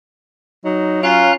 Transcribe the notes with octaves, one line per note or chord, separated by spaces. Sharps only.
F#3 D#4
C#4 F4 F5 A#5 F#6